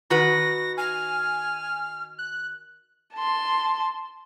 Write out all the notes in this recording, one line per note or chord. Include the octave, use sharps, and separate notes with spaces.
D#3 F#4 B4 A#6
G#5 F6
F#6
A5 C6